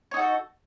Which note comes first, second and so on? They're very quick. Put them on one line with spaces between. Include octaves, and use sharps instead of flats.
C#5 D#4 F#4 A4